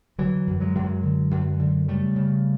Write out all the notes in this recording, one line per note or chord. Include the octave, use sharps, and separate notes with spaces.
D3 E3 F#3
F#2
F#3 G#3
F#2
D3
F#2
D3
C#3 G3 A3
C#3